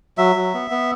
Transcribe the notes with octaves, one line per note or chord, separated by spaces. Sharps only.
F#3 E5
F#3
B3
B3